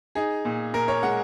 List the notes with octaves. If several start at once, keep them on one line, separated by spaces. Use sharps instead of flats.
D#4 G#4
A#2
A#2 A#4
C#5
G#3 F#5